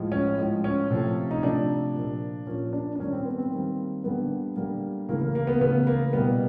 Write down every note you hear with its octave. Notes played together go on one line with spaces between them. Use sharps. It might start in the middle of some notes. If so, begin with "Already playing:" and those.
Already playing: A2 F3 G#3
C#4
A2 F3 G#3
C#4
C3 F3 A3
D#4
C3 F3 A3 D4
A#2 F3 A#3
A#2 F3 A#3 C#4
D4
D4
D#3 G3 A#3 C#4
C4
B3
C4
D#3 G3 A#3
D3 G3 A#3 B3
D3 G3 A#3
C#3 E3 A3 A#3
A#3
A#3
B3
C#3 E3 A3 B3
A#3
B2 G3 A#3 B3